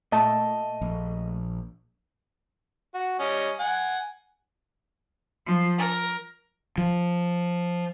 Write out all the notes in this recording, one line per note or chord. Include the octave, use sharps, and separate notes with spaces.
A#2 A3 D#5 A5
A#1
F#4
G3 C#4 D#5
F#5 G#5
F3
A#4
F3